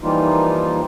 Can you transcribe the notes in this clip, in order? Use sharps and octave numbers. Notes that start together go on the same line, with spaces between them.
E3 F3 G3 A#3 D#4 F4